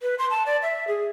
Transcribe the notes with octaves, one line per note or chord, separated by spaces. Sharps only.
B4
C6
A5
D5
E5
G#4